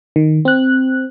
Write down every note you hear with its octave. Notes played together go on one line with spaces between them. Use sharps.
D#3
C4 F#6